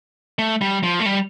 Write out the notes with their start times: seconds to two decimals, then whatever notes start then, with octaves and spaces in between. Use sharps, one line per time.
0.39 A3
0.61 G3
0.83 F3
1.00 A3
1.06 G3